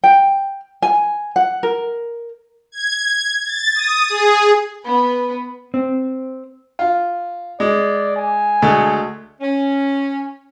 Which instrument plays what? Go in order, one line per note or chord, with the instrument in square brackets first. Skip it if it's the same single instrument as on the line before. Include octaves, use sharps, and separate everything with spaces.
[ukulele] G5
G#5
F#5
A#4
[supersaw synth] G#6
A6
D#6
G#4
[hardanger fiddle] B3 B4
[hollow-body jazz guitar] C4
[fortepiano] F4
[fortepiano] G#3 [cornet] D5
[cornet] G#5
[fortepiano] D2 G#3 A3
[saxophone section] C#4